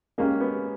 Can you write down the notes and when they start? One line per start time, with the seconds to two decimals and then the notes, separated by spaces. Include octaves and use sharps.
0.18 G#3 A#3 C#4 G4
0.41 B3